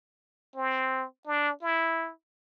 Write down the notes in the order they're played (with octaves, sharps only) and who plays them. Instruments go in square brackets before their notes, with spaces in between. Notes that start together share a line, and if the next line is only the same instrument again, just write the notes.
[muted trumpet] C4
D4
E4